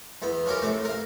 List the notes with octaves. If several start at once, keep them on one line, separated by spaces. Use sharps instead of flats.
E2 B3
F3 C#4 G4 A#4
A2 C3 C4
A#4 F5